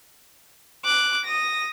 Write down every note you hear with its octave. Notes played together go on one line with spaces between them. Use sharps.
D6 F#6
D#6 A#6